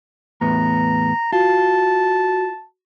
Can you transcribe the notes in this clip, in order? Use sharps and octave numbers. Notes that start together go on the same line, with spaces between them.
E2 A2 B3 A#5
F4 F#4 A5